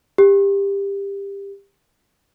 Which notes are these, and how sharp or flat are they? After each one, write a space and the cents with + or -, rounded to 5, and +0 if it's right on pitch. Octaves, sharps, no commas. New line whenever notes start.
G4 +20